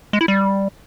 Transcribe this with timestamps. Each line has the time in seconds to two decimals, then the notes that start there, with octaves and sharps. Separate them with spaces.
0.13 G#3
0.21 E4
0.28 G3